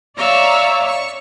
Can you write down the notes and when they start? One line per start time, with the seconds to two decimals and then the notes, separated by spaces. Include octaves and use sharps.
0.17 C#5 D5 E5 F5 A#5
0.86 C#6